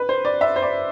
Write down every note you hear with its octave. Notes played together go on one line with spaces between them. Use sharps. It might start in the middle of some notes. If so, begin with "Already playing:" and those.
Already playing: B4
C5
D5
E5
C5
D5